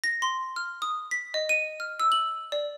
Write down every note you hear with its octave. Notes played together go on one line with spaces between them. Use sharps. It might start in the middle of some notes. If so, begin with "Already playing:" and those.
A#6
C6
F6
D#6
B6
D#5
D#7
F6
E6
F#7
D5